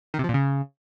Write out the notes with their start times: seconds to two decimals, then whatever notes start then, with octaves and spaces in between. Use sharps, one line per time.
0.14 D#3
0.19 C3
0.24 F3
0.29 A#2
0.34 C#3